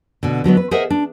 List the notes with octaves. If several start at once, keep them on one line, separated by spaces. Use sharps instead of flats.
B2 D3
D3 F#3 G#3 B3
B4
G#4 A#4 C5 D#5 E5 F#5
D4